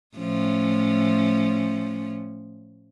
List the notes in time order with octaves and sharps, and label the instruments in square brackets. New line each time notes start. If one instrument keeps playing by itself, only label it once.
[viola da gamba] A2 F3 C#4